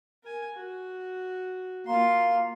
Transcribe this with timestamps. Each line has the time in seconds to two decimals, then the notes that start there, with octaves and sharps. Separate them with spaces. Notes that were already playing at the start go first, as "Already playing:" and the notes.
0.23 A#4 G#5
0.54 F#4
1.87 A#3 F4 C6